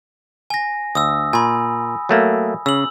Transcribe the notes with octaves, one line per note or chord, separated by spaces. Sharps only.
G#5 A#6
D2 D#6 E6
A#2 G#5 B5
F#3 A3 A#3
C#3 E6 F#7